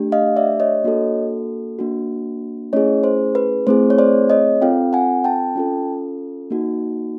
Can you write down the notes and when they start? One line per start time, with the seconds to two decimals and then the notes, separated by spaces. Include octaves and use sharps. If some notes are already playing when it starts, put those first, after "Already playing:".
Already playing: A3 D4 G4
0.12 D#5 F5
0.36 D5 E5
0.60 C#5 D#5
0.84 A#3 D4 F#4 A4
1.79 A#3 D4 F#4
2.73 A3 C#4 E4 G#4 C#5 D#5
3.04 C5
3.35 B4
3.67 A3 C4 E4 G#4 C5
3.90 C#5
3.98 C5 D5
4.30 C#5 D#5
4.62 C4 F4 A4 F5 G5
4.93 F#5 G#5
5.24 G5 A5
5.56 C#4 F4 A4
6.50 A#3 D#4 F#4